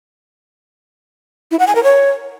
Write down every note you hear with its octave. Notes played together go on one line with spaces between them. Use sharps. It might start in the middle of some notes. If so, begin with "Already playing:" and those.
E4
F#5
G#5
A#4
C#5